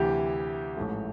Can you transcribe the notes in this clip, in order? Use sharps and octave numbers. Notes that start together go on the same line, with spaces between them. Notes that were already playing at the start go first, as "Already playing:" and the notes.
Already playing: D2 C3 E3 G4
A1 G#2 F3 A3